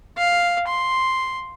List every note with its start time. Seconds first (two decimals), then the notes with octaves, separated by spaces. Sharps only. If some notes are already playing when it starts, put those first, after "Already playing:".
0.18 F5
0.68 C6